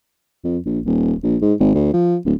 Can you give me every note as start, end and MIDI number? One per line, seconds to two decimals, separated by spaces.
0.44 0.58 41
0.65 0.80 34
0.86 1.13 27
1.23 1.37 34
1.42 1.54 44
1.60 1.74 32
1.74 1.93 38
1.93 2.17 53
2.25 2.34 26